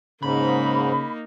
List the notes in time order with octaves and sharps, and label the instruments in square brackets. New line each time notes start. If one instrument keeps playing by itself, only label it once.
[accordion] G#2 [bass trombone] C#3 [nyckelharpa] A#3 D#4 [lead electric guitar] B5